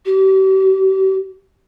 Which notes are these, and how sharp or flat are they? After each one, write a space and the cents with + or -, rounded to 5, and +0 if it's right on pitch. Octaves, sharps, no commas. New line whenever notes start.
G4 -40